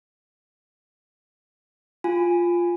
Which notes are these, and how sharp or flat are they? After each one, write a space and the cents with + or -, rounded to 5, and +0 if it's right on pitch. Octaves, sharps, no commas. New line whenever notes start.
F4 +0 G#5 -10